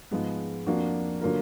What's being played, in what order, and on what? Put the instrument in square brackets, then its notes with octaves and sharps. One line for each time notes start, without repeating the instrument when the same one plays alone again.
[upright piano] G#2 F3 G#3 B3
F2 F3 A#3 D4 F#4
D3 F#3 A#3 F4 A#4